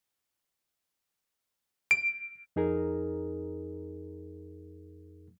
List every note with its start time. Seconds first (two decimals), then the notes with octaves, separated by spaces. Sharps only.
1.91 D7
2.56 F2 D#4 G#4 A#4